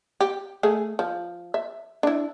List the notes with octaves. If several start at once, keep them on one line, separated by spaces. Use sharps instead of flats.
G4
A3 G#4
F3
E5
D4 E4